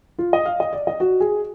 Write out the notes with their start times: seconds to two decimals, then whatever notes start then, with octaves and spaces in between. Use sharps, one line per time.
0.19 F4
0.33 D#5
0.46 F5
0.60 D#5
0.73 D5
0.87 D#5
1.00 F#4
1.20 G#4